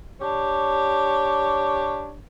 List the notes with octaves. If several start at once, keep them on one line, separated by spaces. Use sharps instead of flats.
D4 G4 C#5